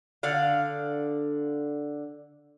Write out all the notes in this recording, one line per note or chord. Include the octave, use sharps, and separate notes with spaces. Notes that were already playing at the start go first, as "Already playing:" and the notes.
D3 D5 F5